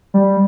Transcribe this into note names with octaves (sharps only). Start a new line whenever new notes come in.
G3